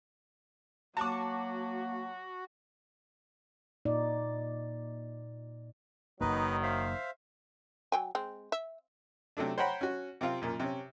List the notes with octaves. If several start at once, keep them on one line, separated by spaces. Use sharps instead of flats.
F#3 A#3 F#4 A5 D6
A#2 D#4 D5
F#1 F2 D#3 F#3 A#3 D#4 B4
C5 E5 F5
F#3 G5 G#5
G#3 C4
E5
C3 F#3 A3 D4
C5 C#5 F#5 G5 A#5 B5
C#4 F#4
C3 C4 F4 F5
F#2 A#2
C3 C#4